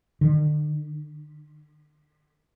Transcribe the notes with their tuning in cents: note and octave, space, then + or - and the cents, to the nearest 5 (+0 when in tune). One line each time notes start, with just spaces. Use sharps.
D3 +40